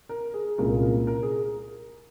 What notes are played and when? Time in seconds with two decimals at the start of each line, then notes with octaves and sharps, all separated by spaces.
0.09 A#4
0.34 G#4
0.58 C2 A#2 G#3 C#4 F4 A#4
0.83 A#4
1.07 A#4
1.23 G#4